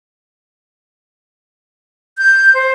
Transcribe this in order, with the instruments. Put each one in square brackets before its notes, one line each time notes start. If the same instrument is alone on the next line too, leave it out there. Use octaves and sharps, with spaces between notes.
[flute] G6
C5